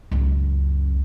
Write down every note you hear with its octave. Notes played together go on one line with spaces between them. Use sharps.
C#2 F#2